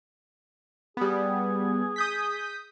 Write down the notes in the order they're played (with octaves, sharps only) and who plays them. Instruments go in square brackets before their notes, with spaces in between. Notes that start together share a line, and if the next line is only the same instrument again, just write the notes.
[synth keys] G3 B3 [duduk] G#4
[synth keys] D#6 G6 B6